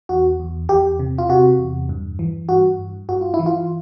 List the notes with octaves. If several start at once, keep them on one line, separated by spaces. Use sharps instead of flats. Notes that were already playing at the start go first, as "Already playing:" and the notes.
E2 F#4
E2
E2 G4
C3
F4
C3 F#4
E2
G2
E3
G2 F#4
G2
G2 F#4
F4
E4
E3
F4